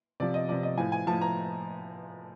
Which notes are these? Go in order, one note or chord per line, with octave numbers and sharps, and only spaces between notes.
C3 F3 D5
D#5
C3 F3 D5
D#5
A2 F3 G#5
G#5
A2 F3 A5
A#5